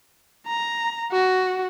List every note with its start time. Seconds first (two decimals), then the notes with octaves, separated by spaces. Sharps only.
0.47 A#5
1.12 F#4